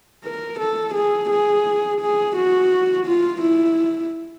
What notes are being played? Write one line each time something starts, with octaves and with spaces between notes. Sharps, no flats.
A#4
A4
G#4
G#4
G#4
F#4
F4
E4